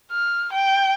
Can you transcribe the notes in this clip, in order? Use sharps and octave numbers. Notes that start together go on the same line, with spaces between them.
F6
G5